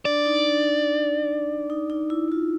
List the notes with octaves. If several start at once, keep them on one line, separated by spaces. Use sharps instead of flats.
D4 D5
D#4
D4
D4
D#4
D#4
E4
F4